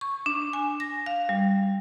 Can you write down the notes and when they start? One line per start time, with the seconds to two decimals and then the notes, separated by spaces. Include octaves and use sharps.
0.01 C#6
0.26 D4
0.53 G#5
0.80 A#6
1.06 F5
1.29 G3